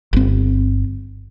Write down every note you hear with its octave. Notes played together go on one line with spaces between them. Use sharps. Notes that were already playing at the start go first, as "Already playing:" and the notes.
G1 C4